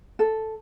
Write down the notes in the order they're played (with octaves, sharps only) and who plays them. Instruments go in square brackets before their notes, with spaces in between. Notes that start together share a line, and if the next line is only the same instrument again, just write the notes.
[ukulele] A4